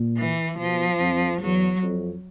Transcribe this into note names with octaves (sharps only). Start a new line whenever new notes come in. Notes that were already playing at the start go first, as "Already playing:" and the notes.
Already playing: A#2
E3
B2 F3
F2
E2 F#3
F2